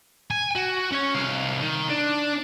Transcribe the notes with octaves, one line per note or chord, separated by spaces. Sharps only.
G#5
F#4
C#4 C#5
C2 F5
D#3
D4